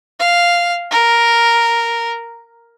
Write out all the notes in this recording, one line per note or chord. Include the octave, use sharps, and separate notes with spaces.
F5
A#4